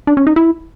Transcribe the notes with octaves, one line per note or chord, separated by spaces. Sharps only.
D4
C#4
D#4
E4